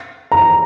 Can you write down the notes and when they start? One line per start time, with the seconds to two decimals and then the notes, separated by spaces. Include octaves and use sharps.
0.32 A#5